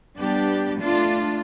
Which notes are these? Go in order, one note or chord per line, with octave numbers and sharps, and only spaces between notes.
G3 B3 D4 G4
A3 D4 F4